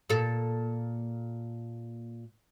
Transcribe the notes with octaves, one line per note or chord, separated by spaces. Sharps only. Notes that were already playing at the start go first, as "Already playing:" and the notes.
A#2 A4